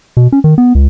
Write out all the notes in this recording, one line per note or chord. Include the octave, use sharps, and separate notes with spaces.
B2
C#4
D#3
B3
C#2